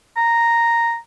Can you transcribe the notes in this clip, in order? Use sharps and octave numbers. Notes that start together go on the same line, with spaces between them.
A#5